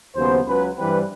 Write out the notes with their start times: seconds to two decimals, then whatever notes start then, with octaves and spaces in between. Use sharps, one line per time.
0.15 D#2 C#3 F#3 B3 C5
0.45 C#2 C#3 F#3 B4
0.77 G2 E3 G3 C4 B4